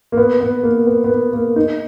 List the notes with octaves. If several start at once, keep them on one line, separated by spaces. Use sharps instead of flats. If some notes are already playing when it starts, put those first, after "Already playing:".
A#3
B3
B3
A#3
B3
B3
A#3
A#3
D#4